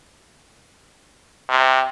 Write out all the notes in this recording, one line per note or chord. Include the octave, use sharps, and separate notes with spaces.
C3